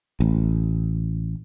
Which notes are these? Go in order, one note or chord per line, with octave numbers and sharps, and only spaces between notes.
A1